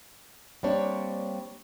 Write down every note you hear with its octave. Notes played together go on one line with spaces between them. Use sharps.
G3 A#3 C4 D4 C#5